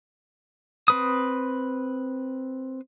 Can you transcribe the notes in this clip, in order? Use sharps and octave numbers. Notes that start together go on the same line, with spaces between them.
C4 B4 D#6